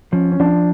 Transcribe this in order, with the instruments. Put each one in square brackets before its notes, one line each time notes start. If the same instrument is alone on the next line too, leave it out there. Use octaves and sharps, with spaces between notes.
[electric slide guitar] F3 [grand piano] C#4
[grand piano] C#4
[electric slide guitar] F3 [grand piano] D4